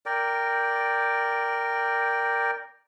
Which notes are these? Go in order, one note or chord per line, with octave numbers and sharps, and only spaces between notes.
A#4 D5 G5